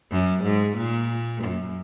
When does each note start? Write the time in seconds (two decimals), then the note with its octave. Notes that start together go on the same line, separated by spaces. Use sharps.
0.11 F#2
0.43 G#2
0.77 A#2
1.44 F#2